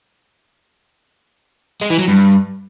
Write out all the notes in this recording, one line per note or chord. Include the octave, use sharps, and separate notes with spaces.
G#3
E3
F#3
G2